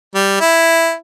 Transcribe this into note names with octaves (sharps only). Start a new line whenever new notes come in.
G3
E4